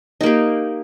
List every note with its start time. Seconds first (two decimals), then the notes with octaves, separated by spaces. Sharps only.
0.21 D#4
0.23 A#3
0.26 G4